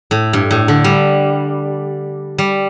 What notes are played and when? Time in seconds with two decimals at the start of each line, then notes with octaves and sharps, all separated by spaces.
0.11 A2
0.33 G2
0.51 A2
0.68 D3
0.84 G3
2.38 G3